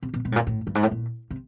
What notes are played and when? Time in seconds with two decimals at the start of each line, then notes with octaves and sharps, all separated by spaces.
0.03 C3
0.14 B2
0.25 B2
0.32 A2
0.36 A#2
0.47 A2
0.67 G2
0.75 G#2
0.83 A2
0.91 A#2
1.30 C3